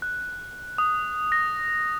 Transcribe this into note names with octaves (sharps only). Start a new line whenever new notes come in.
F#6
D#6
A#6